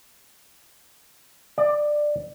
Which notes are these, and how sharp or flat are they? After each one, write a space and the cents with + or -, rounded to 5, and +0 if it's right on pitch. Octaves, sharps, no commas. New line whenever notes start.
D5 +15